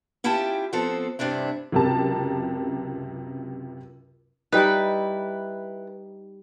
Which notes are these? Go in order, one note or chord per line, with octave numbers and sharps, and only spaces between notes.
C#4 E4 F4 G4 G5 A5
F3 B3 C4 A4
G2 C3 C4 D4 E4
C#2 F#2 C3 G4 A#4 A5
G3 D#4 E4 B4